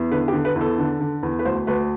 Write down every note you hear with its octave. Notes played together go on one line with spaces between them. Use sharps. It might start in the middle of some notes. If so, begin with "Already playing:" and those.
Already playing: E2
D3 B4
G4
D3
B4
E2
A4
D3
D3
E2
B4
D2 C5
D2 B4